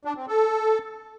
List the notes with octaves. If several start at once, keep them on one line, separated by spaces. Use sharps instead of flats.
D4
C4
A4